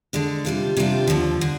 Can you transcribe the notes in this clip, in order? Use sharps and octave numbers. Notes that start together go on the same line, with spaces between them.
D3 G#3 D4
C3 G3 D4 F4
C3 G3 D4 F4
D#2 D3 F3
D3